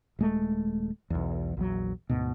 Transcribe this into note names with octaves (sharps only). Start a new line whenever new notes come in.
D#1 G#3 A3
B1 E2
A#1 E2 F#3
D2 G#2 B2